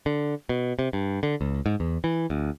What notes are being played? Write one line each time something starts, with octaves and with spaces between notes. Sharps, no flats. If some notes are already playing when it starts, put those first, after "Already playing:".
D3
B2
C3
G2
D3
C#2
G#2
E2
E3
D2